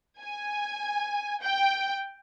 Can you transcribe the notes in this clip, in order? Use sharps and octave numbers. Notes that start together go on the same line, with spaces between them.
G#5
G5